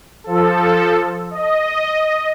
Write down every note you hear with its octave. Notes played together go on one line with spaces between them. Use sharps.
F3 A4
D#5